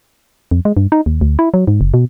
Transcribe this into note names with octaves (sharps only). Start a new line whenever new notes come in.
F2
G#3
G2
D#4
D#2
D2
E4
F#3
G#2
F#1
B2